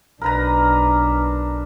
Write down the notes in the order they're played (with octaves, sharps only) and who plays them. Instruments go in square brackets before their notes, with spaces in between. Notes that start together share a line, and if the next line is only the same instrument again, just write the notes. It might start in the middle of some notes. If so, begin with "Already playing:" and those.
[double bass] B1 D4 [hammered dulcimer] A#4 B4 A#5